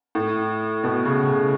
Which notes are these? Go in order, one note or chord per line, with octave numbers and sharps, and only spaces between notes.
A2
B2
C#3
C#3